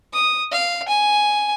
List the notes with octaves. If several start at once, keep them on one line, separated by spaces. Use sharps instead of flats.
D#6
F5
G#5